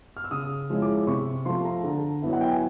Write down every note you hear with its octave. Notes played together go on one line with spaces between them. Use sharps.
F6
E6
C#3 D#6
F3 G#3 C#4 E4
D6
C3 C#6
F3 A3 C6
A#5
D3
F#3 B3 E4
F#5
G5
G#5